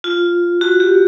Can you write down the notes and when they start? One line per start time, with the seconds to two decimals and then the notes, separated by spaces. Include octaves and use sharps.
0.04 F4
0.61 F#4
0.80 G4